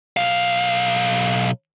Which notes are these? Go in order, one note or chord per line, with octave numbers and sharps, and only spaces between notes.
B1 F5